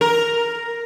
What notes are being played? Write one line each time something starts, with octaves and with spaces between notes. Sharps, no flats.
A#4